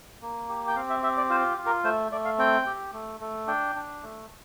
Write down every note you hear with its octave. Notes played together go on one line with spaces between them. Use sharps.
A#3
G4
G5
C4 F5
E5
G4 E5
D5
F4 C5
F4
A#4
A3 C5
A3 D5
F5
C4 G5
G4
A3
A3
D4 G5
D4
A3